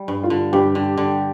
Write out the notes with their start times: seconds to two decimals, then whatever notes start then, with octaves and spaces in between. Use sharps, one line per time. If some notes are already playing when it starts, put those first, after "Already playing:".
Already playing: G3
0.08 G2
0.23 F4
0.30 D3
0.53 G2 G4
0.75 D3
0.98 D3